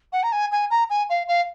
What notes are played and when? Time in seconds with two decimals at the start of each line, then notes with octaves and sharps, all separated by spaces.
0.12 F#5
0.23 A#5
0.32 G#5
0.52 G#5
0.70 A#5
0.90 G#5
1.09 F5
1.28 F5